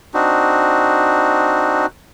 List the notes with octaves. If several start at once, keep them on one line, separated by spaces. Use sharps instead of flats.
C4 D4 D#4 F#4